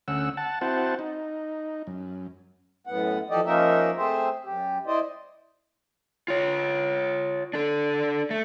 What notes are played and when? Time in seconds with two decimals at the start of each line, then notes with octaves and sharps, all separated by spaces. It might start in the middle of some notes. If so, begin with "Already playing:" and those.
0.08 D2 C#4 F#5 E6
0.37 F#5 A5
0.61 C4 E4 F#4 C5 F#5 A5
0.99 D#4
1.87 F#2
2.87 F#2 A2 B3 F#5
3.30 E3 F3 G4 A4 D5 D#5
3.46 F3 A#3 C#4 D#4 A#4 E5
3.97 A3 C4 G#4 C5 E5
4.45 F#2 G4
4.86 E4 C5 D5 D#5
6.28 F4 C#5
7.53 D4 A4
8.30 A3